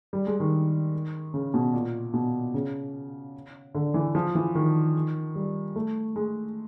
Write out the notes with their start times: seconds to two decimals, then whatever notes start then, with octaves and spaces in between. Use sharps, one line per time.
0.13 G3
0.27 G#3
0.40 D#3
1.34 C#3
1.54 B2
1.73 A#2
2.14 B2
2.54 C#3
3.75 D3
3.94 E3
4.15 F3
4.35 E3
4.55 D#3
5.35 G3
5.76 A3
6.16 G#3